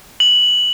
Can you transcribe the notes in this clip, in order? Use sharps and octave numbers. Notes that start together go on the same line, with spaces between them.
F#7